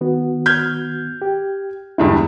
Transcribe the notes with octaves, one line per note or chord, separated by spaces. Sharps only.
D#3 B3 F#4
F6 G6 G#6
G4
E2 G2 D3 G#3 E4